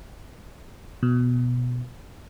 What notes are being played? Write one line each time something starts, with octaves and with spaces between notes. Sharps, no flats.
B2